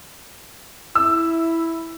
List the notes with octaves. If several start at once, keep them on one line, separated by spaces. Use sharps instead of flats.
E4 E6